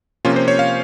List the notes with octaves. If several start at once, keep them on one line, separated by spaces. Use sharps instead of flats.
C3 F3 A#3 C#4 F4
C5
C#5
F5